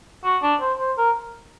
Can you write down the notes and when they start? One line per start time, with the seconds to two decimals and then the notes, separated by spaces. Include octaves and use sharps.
0.24 F#4
0.42 D4
0.60 C5
0.79 C5
0.98 A#4